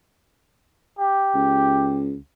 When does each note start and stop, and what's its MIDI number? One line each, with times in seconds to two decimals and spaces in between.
0.99 2.02 67
1.35 2.16 37